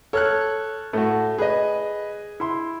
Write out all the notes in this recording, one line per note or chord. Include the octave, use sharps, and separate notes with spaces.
A4 C#5 F6 F#6
A2 A3 F#4
G#4 B4 D#5
E4 C6